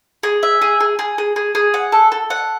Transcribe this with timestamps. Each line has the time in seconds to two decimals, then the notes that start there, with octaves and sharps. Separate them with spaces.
0.23 G#4
0.43 E5
0.62 G#4
0.80 G#4
0.99 G#4
1.18 G#4
1.36 G#4
1.55 G#4
1.74 F#5
1.92 A4
2.12 A4
2.30 F#5